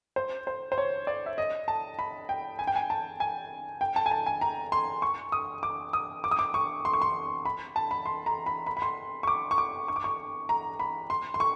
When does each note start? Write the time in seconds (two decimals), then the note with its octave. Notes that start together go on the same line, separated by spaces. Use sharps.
0.16 C5
0.47 C5
0.72 C5
0.78 C#5
1.07 D5
1.26 E5
1.38 D#5
1.68 A5
1.99 B5
2.29 G5
2.59 G#5
2.67 G5
2.76 G#5
2.90 A5
3.20 G#5
3.81 G5
3.96 A5
4.06 G#5
4.11 A5
4.26 G#5
4.41 A#5
4.72 C6
5.02 C#6
5.32 D#6
5.63 D6
5.93 D#6
6.24 D6
6.31 D#6
6.39 D6
6.54 C#6
6.85 C6
6.93 C#6
7.02 C6
7.45 B5
7.76 A5
7.91 B5
8.06 C6
8.26 A#5
8.46 B5
8.67 B5
8.77 B5
8.82 C6
9.23 C#6
9.27 D6
9.51 C#6
9.58 D6
9.88 C#6
9.96 D6
10.04 C#6
10.49 A#5
10.79 B5
11.10 C6
11.34 C6
11.40 C#6